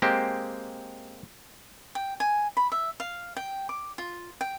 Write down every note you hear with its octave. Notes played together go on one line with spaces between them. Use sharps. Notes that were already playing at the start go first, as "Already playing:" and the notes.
G#3 A#3 C4 G4
G5
G#5
B5
E5
F5
G5
D6
F4
G5